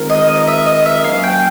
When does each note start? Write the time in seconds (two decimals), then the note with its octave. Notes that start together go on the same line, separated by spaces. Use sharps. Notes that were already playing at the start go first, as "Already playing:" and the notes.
Already playing: D#3 G#3 C4 F4 A#4
0.10 D#5
0.28 D#5
0.48 E5
0.66 D#5
0.86 E5
1.04 F#3 A#3 C#4 F5
1.24 G5